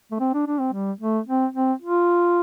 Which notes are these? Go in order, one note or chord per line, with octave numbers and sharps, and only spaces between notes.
A3
C4
D4
D4
C4
G3
A3
C4
C4
F4